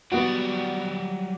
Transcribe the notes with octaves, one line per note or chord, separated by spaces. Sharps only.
F#3 G3 B3 F#4 D5